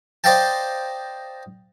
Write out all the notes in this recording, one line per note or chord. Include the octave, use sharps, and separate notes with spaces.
C5 D5 D#5 F5 G5 A5